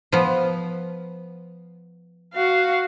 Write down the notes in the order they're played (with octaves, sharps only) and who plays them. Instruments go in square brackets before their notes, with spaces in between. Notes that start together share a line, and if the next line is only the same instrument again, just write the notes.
[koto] F3 B3
[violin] F#4 F5